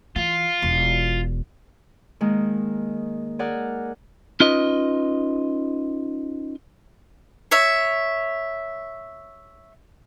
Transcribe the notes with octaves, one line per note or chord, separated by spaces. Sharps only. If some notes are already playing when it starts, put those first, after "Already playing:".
E3 F4
E1
D#3 G#3 A#3
G#4 A#4 D5 F#5
C#4 D#4 F4 B4 D#5
C#5 E5